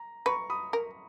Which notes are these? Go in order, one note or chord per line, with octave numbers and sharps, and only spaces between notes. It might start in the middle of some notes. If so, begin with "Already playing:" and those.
Already playing: A#5
B4 A#5 C#6
B5 D#6
A#4